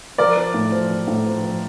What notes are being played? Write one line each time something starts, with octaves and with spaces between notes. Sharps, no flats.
F3 A#4 D5
F3
A2
F3
F3
A2
F3
F3